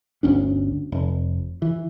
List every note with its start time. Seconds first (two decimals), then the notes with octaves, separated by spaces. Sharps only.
0.23 G1 D2 C#4 D4
0.92 F1
1.62 E3